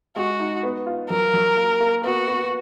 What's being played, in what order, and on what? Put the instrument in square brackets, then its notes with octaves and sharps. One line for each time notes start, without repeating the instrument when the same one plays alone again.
[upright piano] G#3 [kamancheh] F#4
[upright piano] D#4
B3
F4
[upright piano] F#3 [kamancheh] A#4
[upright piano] F#3
A#3
A#3
[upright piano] B3 [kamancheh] F#4
[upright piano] B3